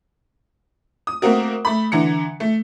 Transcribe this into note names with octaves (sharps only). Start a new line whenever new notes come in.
D#6
A3 A#3 C4 F#4 A#4
A3 B5
D3 E3 A#5 C#7
A3